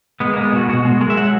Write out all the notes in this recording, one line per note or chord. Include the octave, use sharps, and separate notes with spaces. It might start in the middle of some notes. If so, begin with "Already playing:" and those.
G#3 B3
G#3 A#3
B3
B2 F#4
B2 F#4
G#3 G#4
G#3 A#4
E5
F#3 F#5